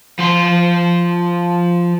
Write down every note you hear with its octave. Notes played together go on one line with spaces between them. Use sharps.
F3 C6